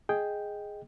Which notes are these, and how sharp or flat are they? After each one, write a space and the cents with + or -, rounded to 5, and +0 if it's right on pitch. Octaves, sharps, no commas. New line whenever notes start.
G#4 +0 D#5 +0 G5 +0